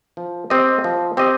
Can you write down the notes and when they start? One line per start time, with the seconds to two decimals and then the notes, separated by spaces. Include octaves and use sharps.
0.17 F3
0.50 C4 G4 D#5
0.84 F3
1.17 C4 G4 D#5